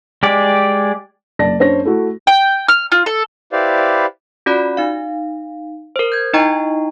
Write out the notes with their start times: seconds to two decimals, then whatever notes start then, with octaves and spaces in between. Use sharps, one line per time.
0.23 G#3 G4 D5
1.39 F#1 D5 A5 A#6
1.59 F#2 D4 C5 C#5 A#6
1.85 A3 E4 F#4
2.27 G5
2.68 F6
2.92 F4
3.06 A4
3.52 E4 G4 B4 C5 D5 F5
4.46 C#4 F4 F#4 D5 B5 F#6
4.77 D#4 F5
5.96 A#4 C5
6.12 G6 G#6
6.33 D#4 E4 D#5 G5 A#5 C#6